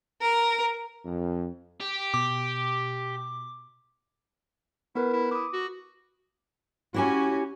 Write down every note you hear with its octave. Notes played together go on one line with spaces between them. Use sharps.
A#4
F2
G4
B2 D6
B3 E4 A#4 B4
E4
E4 D6 D#6
F#4
C#4 E4 F#4 G4 G#5